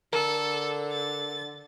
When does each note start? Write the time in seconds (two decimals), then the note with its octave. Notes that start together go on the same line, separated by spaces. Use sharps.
0.13 D3 A4 A#4
0.92 A6